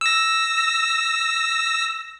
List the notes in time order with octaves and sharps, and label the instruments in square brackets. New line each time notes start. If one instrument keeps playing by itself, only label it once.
[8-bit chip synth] E6 A#6